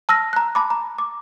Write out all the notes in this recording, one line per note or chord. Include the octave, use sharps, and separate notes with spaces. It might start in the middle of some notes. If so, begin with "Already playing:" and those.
A5 E6 F6 A#6
A#5 F#6
A5 B5 D6
A#5
D6